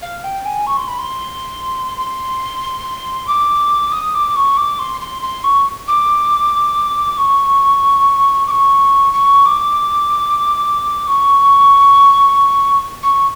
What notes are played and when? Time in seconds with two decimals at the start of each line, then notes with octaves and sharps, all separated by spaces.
0.02 F5
0.24 G5
0.45 G#5
0.67 C#6
0.77 C6
0.88 B5
0.98 C6
1.97 C6
3.27 D6
3.92 D#6
4.14 D6
4.36 C#6
4.57 D6
4.79 C6
5.01 C6
5.22 C6
5.44 C#6
5.88 D6
7.18 C#6
8.47 D6
8.51 C#6
9.13 C#6
9.46 D6
11.07 C#6
13.03 C#6